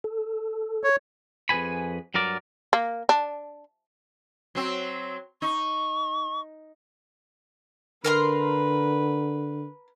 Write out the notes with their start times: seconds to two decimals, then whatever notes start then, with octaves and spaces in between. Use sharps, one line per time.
0.04 A4
0.84 C#5
1.49 F2 G#4 B4 G#5 B5
2.14 G2 F#3 A#4 D5
2.73 A#3
3.09 D4
4.55 F#3 C4
5.42 D#4 C#6
8.04 D3 A#4 B4 A#5 C6